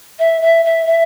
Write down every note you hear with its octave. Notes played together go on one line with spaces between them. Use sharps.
E5
E5
E5
E5